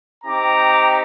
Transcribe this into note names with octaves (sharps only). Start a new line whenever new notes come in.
C4 D#4 G4 A#5 D6